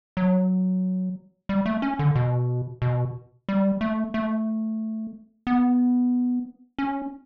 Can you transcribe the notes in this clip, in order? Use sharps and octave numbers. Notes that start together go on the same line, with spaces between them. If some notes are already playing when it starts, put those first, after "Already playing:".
F#3
G3
A3
C#4
D3
B2
B2
G3
A3
A3
B3
C#4